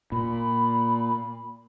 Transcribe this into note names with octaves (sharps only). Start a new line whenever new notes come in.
A#2 B5